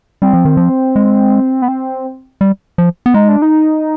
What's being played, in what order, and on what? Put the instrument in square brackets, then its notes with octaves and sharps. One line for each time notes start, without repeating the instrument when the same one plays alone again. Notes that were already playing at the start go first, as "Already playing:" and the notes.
[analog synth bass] G3 [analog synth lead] C4
[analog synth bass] F3
D#3
F3
G#3
[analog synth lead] B3
C4
[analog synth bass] G3
F3
B3
[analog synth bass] G#3 [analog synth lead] D#4
[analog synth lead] D4
D#4